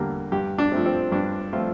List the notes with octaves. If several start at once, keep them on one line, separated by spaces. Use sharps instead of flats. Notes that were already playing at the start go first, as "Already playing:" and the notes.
Already playing: E2 D3 G3 A#3
G2 G4
D4
F3 A3 C4
C4
G2 D4
F3 A3 C4 F4